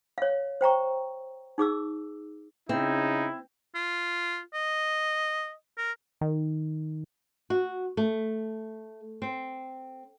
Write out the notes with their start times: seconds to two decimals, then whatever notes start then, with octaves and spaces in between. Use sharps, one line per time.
0.18 C#5 F5
0.61 C5 G5 A#5 C#6
1.58 D#4 G#4 D6 E6
2.69 C#3 C4 D#4 E4
3.75 F4
4.54 D#5
5.78 A#4
6.21 D#3
7.50 F#4
7.97 A3
9.22 C4